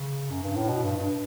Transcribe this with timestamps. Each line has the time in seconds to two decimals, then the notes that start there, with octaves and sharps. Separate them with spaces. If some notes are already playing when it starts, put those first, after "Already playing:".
Already playing: C#3
0.30 F#2
0.43 G2
0.56 A2
0.68 B2
0.83 G2
0.97 G2